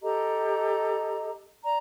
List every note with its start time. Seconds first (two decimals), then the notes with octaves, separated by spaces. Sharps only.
0.02 G4 A4 D#5 A#5
1.63 D5 A#5